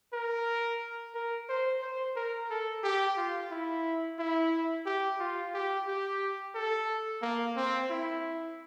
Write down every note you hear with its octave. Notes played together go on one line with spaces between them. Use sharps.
A#4
A#4
C5
C5
A#4
A4
G4
F4
E4
E4
G4
F4
G4
G4
A4
A#3
C4
E4